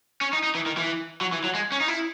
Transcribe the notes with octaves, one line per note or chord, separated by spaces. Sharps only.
C#4
D#4
D#4
E3
D#3
E3
F#3
E3
F#3
G#3
C#4
D#4
E4